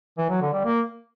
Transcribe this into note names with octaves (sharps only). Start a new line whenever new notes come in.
E3
F#3
D3
G3
A#3